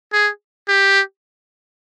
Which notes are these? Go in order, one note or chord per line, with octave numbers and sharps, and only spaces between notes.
G#4
G4